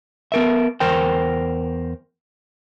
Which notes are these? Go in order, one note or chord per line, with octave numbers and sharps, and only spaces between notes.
B3 A#4 E5
E2 A#4 C5 G5